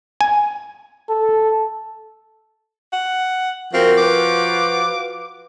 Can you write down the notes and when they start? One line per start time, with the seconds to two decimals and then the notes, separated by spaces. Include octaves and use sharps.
0.21 G#5
1.09 A4
2.93 F#5
3.74 F3 C4 F#4 A#4 F5
3.98 B4 D6